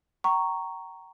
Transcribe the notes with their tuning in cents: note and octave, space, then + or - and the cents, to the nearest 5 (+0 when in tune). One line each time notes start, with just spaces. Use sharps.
G5 -40 A#5 +0 C#6 +0